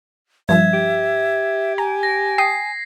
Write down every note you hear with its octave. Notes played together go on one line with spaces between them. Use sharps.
G2 F3 E5 G#6
G4
G#5 A#5
A#6
G5 D#6 C7